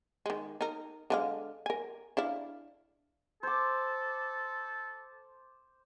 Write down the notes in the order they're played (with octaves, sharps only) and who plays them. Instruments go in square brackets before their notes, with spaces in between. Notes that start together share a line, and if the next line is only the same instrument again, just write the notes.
[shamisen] D#3 G#3
D#4 A#4
D3 G#3 F5
A#4 G#5
D4 E4 F5
[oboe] A4 [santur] C5 D6